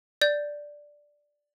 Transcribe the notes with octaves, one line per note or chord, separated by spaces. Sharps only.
D5 G6